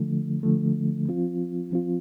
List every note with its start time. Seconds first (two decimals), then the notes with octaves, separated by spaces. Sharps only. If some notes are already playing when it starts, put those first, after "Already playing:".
Already playing: D3 F3 A3
0.43 D3 F3 A3
1.08 F3 C4 F4
1.72 F3 C4 F4